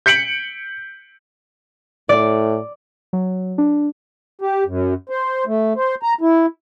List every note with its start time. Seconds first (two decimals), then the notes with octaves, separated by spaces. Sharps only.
0.06 G6 B6 C#7 D7 F#7
2.09 A2 D5
3.13 F#3
3.58 D4
4.41 G4
4.66 F#2
5.10 C5
5.47 A3
5.76 C5
6.03 A#5
6.21 E4